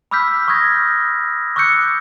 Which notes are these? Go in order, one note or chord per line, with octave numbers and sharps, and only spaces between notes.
B5 D6 E6 F6 G6 B6
C#6 D#6 F6 G6 G#6 A#6
C#6 D6 E6 F#6 G6 C#7